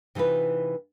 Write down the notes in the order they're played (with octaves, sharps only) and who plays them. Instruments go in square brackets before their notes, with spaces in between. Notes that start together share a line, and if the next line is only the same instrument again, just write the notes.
[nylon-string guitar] C3 E3 D#4 F4 B4